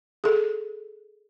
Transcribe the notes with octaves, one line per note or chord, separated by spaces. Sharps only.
G#4 A4